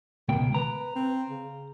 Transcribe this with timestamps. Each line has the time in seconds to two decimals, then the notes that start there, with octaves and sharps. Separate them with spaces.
0.29 C#2 B2 D#3 G5
0.54 B4 A#5
0.95 C4
1.29 C#3